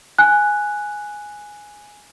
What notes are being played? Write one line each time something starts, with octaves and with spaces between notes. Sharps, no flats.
G#5 F#6